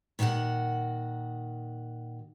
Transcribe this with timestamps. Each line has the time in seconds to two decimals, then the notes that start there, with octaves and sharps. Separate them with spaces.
0.19 A#2 D#3 F#4 C5 F#5